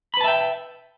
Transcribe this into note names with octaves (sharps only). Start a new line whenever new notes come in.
B4 E5 G5 A5 B5